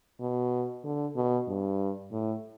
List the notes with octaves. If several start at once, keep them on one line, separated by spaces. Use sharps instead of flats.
B2
D3
B2
G2
A2